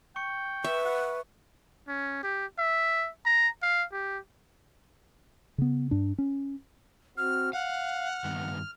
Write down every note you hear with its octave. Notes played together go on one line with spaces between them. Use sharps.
G5 C#6 C#7
B4 E5 C#6
F#5
C#4
G4
E5
A#5
F5
G4
C#3 B3
G2 D4
C#4
C4 F#4 F6
F5 F#5 F6
G2 D#3 B3